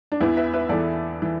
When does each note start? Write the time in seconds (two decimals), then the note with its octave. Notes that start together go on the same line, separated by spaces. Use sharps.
0.12 D4
0.21 E2 E3 B3 E4
0.37 B4 E5
0.53 B4 E5
0.69 E2 E3 A4 D5
1.22 E3